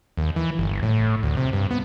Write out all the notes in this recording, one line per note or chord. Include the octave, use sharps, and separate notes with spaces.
D#2
E3
G1
A2
D2
C3
G2
B3